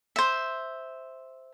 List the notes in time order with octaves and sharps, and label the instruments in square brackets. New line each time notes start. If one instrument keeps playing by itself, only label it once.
[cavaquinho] C5 E5